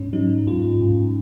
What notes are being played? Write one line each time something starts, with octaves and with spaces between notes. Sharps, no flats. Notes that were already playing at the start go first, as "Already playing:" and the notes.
Already playing: G#2 C#4
F#3 D#4
G#2 F4
G#2